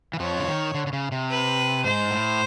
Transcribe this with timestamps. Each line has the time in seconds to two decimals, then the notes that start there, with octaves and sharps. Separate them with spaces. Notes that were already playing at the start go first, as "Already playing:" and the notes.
0.13 E3
0.20 F2 F3 C#5
0.40 D3
0.48 D#3
0.74 D3
0.87 D3
0.93 C#3
1.12 C3
1.30 B4
1.84 G#2 C5
2.11 A2